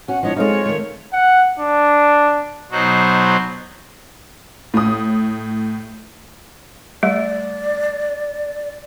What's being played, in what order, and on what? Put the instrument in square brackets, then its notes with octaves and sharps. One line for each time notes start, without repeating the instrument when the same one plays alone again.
[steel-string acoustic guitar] C#4 F#4 [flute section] F#5
[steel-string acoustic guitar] F3 D4 E4 [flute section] C#5 D#5
[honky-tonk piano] G#3 A3 D#4 [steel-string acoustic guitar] C4 G#4 [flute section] F4 C#5
[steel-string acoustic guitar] D#3 A3
[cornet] F#5
D4
[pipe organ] B2 F#3 D#4 F#4 C5
[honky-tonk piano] A2 D#6
[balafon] G3 A3 [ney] D5